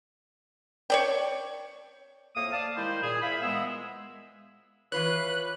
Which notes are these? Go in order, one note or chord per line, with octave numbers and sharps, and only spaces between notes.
C#5 D5 G5
F2 A2 A#3 F5 D#6
D5 F5 A5
D#3 G3 G#3 E4 C5
A#2 G#4
E4 F4 C5 F5 B5
A#2 E3 G#3 B3 G#4 E6
E3 F4 B4 C#5 F#6